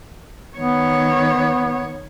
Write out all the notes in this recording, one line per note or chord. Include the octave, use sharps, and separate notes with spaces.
D#3 B3 C#5